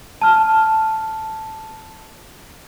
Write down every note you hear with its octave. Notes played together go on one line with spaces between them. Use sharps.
A5 F6